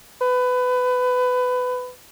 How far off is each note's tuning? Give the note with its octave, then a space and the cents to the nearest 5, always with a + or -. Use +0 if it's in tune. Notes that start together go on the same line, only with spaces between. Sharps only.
B4 +20